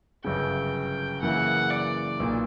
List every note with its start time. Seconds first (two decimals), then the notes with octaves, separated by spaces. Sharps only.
0.25 G1 F#2 C#3 G5
1.22 F#2 C#3 E3 A#3 F#5
1.71 D5
2.20 B1 A#2 A#3